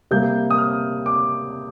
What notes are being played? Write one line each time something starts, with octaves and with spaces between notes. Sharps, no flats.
C3 G3 A#3 G6
D#6
F6
D6